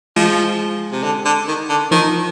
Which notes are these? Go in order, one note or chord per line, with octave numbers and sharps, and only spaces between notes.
F3 G#3
C3
D3
D3
D#3
D3
D#3 F3